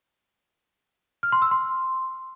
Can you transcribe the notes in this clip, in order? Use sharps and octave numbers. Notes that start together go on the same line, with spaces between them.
F6
C6
E6
C6